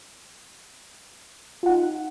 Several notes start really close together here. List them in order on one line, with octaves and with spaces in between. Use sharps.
F4 F#5 D#4